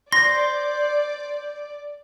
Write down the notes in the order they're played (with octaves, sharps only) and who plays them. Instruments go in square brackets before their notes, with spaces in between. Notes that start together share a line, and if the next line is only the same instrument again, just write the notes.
[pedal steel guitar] C5 C6 [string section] D5 [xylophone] A#6